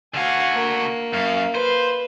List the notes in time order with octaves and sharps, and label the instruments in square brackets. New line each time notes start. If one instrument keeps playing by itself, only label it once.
[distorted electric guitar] D3 F#4 [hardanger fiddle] F5 [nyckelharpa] F#5 G#5
[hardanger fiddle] A#3
[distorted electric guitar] F#2 [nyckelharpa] F5
[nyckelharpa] B4 [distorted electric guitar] C5